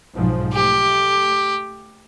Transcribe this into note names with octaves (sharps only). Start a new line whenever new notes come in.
B1 G#2 F3
A3 G4